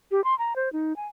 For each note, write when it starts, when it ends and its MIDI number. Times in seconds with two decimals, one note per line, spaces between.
0.11 0.24 67
0.24 0.37 84
0.39 0.56 82
0.56 0.72 72
0.73 0.96 63
0.96 1.07 80